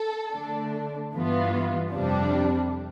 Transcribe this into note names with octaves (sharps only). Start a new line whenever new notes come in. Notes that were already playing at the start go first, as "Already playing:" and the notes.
Already playing: A4
D3 A3 D4
G2 E3 B3 F4
F2 C3 G3 D4